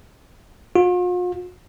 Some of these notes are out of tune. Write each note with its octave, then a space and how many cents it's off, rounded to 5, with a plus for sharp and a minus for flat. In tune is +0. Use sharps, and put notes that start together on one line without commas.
F4 +45